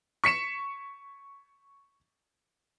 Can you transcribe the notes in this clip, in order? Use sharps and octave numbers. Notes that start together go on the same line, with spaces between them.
C#6 B6 C#7 E7